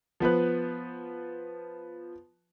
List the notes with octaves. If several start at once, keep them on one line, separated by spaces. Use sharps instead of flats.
F3 B3 B4 F#6